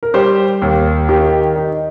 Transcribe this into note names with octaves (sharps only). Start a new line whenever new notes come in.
A#4
G3 G4 C5
D#2
D#3 G4
D#4